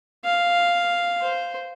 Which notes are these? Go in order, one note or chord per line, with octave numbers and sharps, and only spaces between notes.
F5
C5